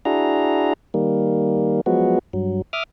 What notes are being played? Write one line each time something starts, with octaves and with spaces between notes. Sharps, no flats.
D4 E4 F#4 G#4 A#5
D#3 G3 A#3
F3 F#3 G#3 B3 F#4
G2 F#3
E5 D6 D#6 F6